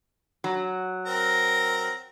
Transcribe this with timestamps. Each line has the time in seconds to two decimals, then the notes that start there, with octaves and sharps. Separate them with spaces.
0.44 F#3
1.06 C4 A#4